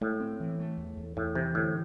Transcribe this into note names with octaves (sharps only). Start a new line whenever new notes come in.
A2 A3
C4
E3
A3
E2
E2
E2 A2
C3 E3
A2 D3